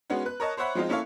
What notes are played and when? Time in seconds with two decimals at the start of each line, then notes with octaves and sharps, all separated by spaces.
0.10 G#3 B3 C#4 D#4 F#4
0.25 B4 F#6
0.40 A#4 C#5 D#5 A5
0.57 C5 C#5 E5 F#5 B5
0.75 F3 G#3 C4 D#4 F4 D#5
0.89 A#3 C#4 E4 A4 C#5 F5